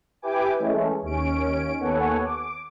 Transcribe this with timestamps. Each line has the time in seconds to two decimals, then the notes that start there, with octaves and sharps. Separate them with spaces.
0.22 E4 G4 B4 G5 G#5 D6
0.59 E3 G#3 A3 C#4
1.02 D#2 C#4 D7
1.79 D#2 B3 A4 C#5 F#5 G#5
2.24 D6